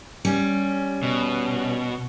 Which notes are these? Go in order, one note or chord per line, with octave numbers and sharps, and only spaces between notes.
G3 C#4
B2